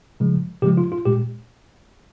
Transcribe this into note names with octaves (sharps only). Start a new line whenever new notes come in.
C#3 F3 G#3
C#3 F3 G#3 G4
F4
F4
A#2 G#3 G4